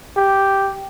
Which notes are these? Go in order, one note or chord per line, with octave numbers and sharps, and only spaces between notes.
G4